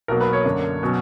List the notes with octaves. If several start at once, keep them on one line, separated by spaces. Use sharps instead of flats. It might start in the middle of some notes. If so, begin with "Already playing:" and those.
B1 B2 F#3 A#3 A#4
B4
C#5
F#2 D3 A#3 D4
B2 F#3 C#4